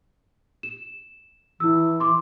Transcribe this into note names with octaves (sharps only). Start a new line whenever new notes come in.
E7
E3 E4 E6
C6 D6